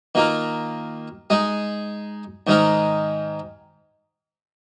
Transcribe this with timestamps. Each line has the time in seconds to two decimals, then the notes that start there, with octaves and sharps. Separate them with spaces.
0.15 D#3 A#3 F4 A#4
1.30 G#3 D#4 G#4
2.47 G#2 D#3 G#3 D#4 A#4